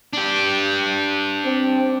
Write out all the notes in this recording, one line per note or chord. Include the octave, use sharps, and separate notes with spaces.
D4 G4
C4